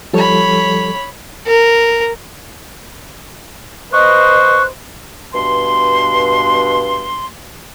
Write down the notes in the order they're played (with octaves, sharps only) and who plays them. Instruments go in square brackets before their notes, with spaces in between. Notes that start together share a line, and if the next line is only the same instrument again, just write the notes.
[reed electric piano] F3 G3 A4 [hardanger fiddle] C#5 B5
[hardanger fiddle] A#4
[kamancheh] B4 D#5 [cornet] C5 [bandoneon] C#6 [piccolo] F#6
[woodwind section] G2 B2 C6